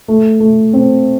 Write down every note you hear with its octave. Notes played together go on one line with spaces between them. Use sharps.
A3
A3
C4